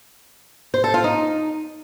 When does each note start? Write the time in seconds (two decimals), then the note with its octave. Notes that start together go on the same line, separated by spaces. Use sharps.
0.74 C5
0.84 A4
0.94 F4
1.04 D#4